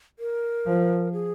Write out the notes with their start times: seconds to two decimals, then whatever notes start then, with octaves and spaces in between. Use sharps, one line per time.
0.19 A#4
0.66 F3
1.13 G#4